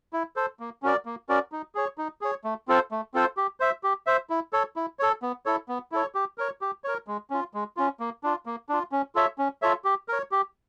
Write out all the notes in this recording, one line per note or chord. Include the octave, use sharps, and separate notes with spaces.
E4
A4 C5
A#3
C#4 F#4 A#4 D5
A#3
C#4 F#4 A#4 D5
D#4
G#4 C#5
D#4
G#4 C#5
A3
C4 F4 A4 C5
A3
C4 F4 A4 C5
G4
C5 E5
G4
C5 E5
E4
A4 C#5
E4
A4 C#5
B3
E4 A4 C#5
B3
E4 A4 C#5
G4
A#4 C#5
G4
A#4 C#5
G#3
C#4 F4
G#3
C#4 F4
A#3
D4 F4
A#3
D4 F4
C#4
F4 A4 C#5 E5
C#4
F4 A4 C#5 E5
G4
A#4 C#5
G4